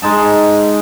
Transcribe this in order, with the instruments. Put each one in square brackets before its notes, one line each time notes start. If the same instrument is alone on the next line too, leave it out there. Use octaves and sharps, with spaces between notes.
[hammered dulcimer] G#3 D#4 A5